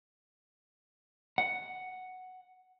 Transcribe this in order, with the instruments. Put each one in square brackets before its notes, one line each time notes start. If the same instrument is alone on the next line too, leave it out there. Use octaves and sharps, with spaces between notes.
[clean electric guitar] F#5